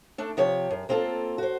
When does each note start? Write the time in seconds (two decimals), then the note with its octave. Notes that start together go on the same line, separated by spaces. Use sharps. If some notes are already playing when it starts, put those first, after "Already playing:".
0.18 A3 D4 E5
0.37 C3 F3 G4 C#5
0.71 F#2
0.89 A#3 C4 F4 G#4 A4
1.38 F#4 C5